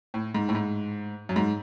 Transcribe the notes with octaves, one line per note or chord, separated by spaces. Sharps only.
A2
G#2
A2
G#2
F#2
G#2